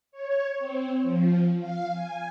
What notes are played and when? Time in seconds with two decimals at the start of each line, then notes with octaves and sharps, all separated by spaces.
0.12 C#5
0.59 C4
1.02 F3
1.59 F5
1.92 G#5